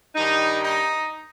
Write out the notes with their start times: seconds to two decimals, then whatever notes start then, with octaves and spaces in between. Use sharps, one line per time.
0.15 G2 D#3 G3 D#4
0.63 D#4